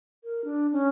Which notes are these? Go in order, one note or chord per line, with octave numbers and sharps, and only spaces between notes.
A#4
D4
C#4